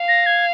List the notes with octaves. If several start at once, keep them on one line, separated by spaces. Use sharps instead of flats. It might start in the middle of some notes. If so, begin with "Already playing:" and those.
Already playing: F5
A#6
G#6